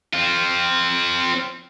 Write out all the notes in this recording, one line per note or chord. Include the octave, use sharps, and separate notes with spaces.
C4 F4